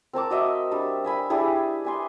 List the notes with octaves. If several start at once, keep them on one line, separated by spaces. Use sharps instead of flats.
C4 A#4 A5 D6
F#4 D#5 E5
G3 D4
E5 G#5 B5
D4 E4 G4 G#4
B4 G#5 C6